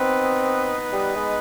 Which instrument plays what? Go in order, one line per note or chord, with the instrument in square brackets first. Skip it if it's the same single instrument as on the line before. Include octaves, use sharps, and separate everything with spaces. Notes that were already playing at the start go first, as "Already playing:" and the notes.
Already playing: [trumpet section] B3 D#4 B4 D#5 [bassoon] C4
[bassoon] G3
G#3